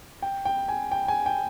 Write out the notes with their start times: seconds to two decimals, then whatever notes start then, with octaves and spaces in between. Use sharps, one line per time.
0.22 G5
0.45 G5
0.68 G#5
0.91 G5
1.08 G#5
1.26 G5